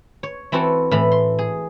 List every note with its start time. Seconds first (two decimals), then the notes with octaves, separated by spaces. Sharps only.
0.23 C#5
0.52 E3 C4 E4 F#4 A4
0.91 A2 E3 B5
1.12 C6
1.39 G#4